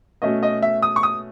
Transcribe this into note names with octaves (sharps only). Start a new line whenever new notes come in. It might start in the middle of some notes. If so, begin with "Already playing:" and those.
B2 A3 C#4 D#5
D#5
E5
D#6
C#6
D#6